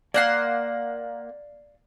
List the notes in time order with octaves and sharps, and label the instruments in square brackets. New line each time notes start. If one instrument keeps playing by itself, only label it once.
[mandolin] A#3 F#5 C6 [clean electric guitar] D5 F5